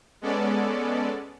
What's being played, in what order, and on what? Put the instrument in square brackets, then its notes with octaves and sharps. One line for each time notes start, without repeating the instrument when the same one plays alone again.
[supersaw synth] G#3 B3 C#4 A4 D5